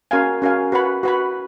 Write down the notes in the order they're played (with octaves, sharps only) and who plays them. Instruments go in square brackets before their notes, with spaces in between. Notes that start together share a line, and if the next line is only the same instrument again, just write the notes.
[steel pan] C#4 F#4 A#4 F5 G#5
C#4 F#4 A#4 F5 G#5
F#4 B4 F#5 B5
F#4 B4 F#5 B5